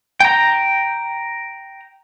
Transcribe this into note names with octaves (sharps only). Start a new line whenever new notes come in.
G5 A#5